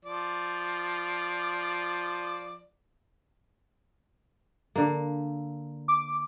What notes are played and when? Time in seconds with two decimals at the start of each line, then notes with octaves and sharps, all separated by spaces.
0.05 F3 D5
4.75 D3 A#3
5.88 D6